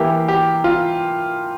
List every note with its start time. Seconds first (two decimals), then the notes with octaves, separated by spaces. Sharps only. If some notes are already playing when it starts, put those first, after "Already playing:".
Already playing: E3 A#3 E4 G4
0.28 G4
0.64 F4